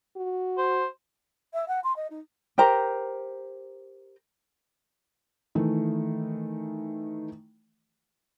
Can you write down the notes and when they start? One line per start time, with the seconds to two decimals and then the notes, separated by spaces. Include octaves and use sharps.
0.17 F#4
0.58 C5
1.53 E5
1.68 F#5
1.84 C6
1.96 D#5
2.10 D#4
2.58 G4 A#4 C5 A#5
5.55 D#3 E3 A3